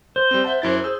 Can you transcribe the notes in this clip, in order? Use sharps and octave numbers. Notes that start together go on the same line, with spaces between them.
C5
G3 C4
E5 F#5 A5
F#2 E4 A6
G#4 E6